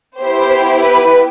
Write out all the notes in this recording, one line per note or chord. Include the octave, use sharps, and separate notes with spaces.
B3 E4 G4 C5
B4